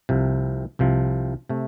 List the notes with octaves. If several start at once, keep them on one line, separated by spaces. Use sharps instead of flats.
C2 C3 F3
C2 C3 F3
C3 A3